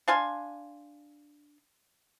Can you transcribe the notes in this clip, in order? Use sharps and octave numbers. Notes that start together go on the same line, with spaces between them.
D4 F5 G#5 C6